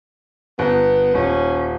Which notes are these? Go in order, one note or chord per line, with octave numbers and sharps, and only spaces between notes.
G1 B3
D#1 C#4